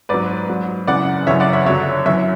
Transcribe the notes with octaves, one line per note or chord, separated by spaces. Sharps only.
G#2 F#3 B4 D5
G#2 F#3
F#2 C#3 E3 D5 F#5
F#2 C#3 E3 C#5 E5
D5 F#5
C#5 E5
F#2 D3 F#3 C#5 E5
F#2 E3 C#5 E5